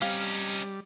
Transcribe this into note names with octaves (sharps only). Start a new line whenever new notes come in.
G3 C4 C#4 D#4 F5